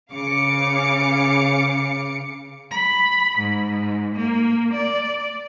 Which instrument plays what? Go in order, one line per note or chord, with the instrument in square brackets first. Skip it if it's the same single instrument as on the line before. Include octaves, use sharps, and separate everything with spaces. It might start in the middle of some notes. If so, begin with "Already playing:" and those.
[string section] C#3 F5 D6 C#7
[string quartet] B5
G#2
A#3
D5